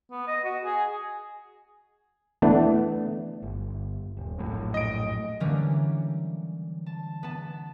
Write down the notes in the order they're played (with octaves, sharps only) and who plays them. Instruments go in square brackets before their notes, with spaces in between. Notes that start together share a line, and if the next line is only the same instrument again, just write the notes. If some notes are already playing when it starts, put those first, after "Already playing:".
[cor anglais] B3
D#5
F#4
G#4
[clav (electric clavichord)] E3 A3 B3 D4
[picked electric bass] G1
D#1
A#1 F#2 A2
[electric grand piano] D#5 D7
[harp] D3 E3 F#3 G3 A#3 C#4
A5
B3 A5